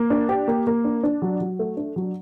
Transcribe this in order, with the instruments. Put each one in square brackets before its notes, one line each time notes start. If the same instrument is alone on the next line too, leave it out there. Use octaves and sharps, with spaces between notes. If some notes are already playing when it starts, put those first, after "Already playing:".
Already playing: [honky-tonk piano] A#3
D4
G4
A#3
A#3
D4
D4
F#3
F#3
A3
D4
F#3